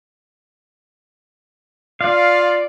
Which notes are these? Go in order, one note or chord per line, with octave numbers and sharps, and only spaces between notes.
F4 D5 F5